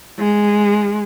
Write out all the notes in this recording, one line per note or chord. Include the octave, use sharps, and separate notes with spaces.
G#3